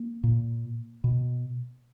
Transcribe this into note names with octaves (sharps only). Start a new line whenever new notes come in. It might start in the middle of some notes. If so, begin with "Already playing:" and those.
Already playing: A#3
A#2
B2